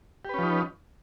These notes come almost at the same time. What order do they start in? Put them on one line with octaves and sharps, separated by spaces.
G4 B4 C#4 F3 D#4